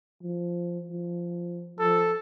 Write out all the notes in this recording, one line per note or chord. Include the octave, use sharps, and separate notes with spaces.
F3
F3
F3 A4